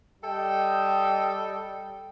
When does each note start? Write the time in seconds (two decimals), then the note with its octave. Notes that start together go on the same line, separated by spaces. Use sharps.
0.22 G3 A4 D#5 G5